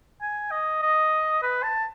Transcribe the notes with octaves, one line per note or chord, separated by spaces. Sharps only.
G#5
D#5
D#5
B4
A5